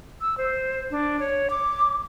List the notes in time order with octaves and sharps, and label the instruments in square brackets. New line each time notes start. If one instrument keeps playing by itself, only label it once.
[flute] E6
C5
D4
C#5
D6